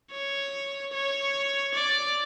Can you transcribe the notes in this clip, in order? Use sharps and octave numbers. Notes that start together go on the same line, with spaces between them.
C#5
C#5
D5